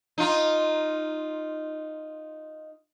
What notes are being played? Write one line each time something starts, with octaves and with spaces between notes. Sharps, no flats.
D#4 F4